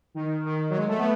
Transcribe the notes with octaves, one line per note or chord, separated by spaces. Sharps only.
D#3
D#3
F#3
G#3
A3
B3